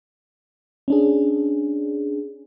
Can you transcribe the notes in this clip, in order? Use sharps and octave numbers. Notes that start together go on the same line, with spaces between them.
C#4 D4 G#4